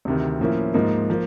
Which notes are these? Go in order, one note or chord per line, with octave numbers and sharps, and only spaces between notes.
D2 C3 D#3
A2 F3 A#3 C#4 E4
G#2 F3 A#3 D#4
F3 A#3